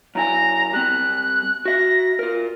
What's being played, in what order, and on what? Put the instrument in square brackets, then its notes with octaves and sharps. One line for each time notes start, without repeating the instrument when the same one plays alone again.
[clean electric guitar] F#2 E4 G#5 [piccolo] A#5
[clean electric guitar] G3 C4 [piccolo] F#6
[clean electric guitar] F#4 E5 [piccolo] A#6
[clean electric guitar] F4 A#4